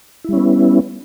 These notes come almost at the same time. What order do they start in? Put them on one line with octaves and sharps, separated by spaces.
E4 G3 C#4 B3